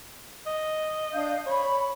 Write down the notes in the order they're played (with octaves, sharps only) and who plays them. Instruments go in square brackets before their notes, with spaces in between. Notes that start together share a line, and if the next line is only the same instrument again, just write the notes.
[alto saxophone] D#5
[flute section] D4 F5 G6
[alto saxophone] C#5 [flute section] B5